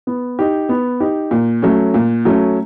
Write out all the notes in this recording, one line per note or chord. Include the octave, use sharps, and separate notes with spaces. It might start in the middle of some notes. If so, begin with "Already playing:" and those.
B3
D#4 G4
B3
D#4 G4
A#2
F#3 A3 C#4
A#2
F#3 A3 C#4